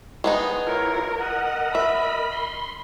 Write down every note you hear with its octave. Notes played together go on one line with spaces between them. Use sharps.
G#3 B3 D#4
E4 F4 A#4 C#5
A#4 D#5 F#5
E5 B5
C6